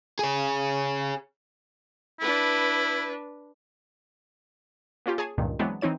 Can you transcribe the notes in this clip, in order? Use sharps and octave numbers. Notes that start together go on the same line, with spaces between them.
G#4 C#5
D4 E4 B4
A#3 C#4 F4 G4
G#4 C#5 G#5 A5
C#2 G2 A#2 D#3
E3 F#3 G#3 B3 C4 D4
E3 C4 D#4 C#5 D#7